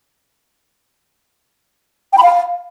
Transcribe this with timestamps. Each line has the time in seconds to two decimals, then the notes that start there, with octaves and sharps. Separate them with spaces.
2.13 G5
2.18 B5
2.23 F5